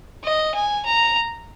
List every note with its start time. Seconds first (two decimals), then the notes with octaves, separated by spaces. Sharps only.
0.24 D#5
0.55 G#5
0.85 A#5